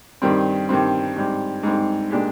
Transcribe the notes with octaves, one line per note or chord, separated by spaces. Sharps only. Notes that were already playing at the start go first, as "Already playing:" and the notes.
G2 D#3 G3 C4
G2 D#3 G3 C4
G#2 G3 C4
G#2 G3 C4
A#2 G#3 D4 G4